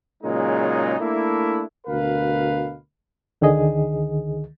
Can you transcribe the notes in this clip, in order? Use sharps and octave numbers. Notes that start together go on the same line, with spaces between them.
A#2 C#3 F#3 G#3 D#4
A3 A#3 D4 E4
D2 B2 A#4 B4 F5
C#2 D3 D#3 G#4 D#5